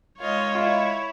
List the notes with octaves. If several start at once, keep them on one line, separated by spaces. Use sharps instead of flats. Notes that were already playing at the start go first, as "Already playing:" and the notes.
D#3 G#3 F4 C#5 D#5
E4 F4